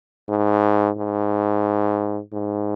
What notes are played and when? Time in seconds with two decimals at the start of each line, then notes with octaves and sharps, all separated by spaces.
0.29 G#2
0.97 G#2
2.32 G#2